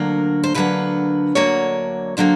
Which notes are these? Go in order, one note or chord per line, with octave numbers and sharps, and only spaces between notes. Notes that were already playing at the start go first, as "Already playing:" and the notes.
Already playing: D2 D3 F#3 A#3 A#4
C5
D2 D3 F#3 A#3 B4
D2 D3 F#3 A#3 C#5
D3 F#3 A#3 C5